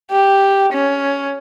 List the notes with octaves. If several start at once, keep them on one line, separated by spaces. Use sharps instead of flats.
G4
C#4